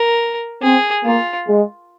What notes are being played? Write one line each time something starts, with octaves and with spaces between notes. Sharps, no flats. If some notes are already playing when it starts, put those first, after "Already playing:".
Already playing: A#4
C4 G#4
A#3 F4
G#3